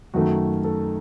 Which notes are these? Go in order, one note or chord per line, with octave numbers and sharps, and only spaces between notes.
F#2 D#3 A3 F#4
A4